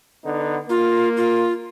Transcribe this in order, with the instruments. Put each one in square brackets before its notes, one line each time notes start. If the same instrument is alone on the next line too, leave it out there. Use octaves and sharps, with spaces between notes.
[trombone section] D3 B3 D#4
[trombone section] A#3 [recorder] F4
[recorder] F4